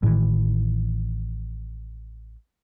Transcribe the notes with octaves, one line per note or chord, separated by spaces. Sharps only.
A1 A2 D#3 E3